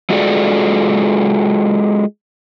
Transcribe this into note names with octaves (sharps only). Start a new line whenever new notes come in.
G#3 F4 F#4 G#4 A4 D5